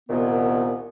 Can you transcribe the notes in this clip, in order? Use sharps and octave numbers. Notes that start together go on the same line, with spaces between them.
C2 A#2 D#3 B3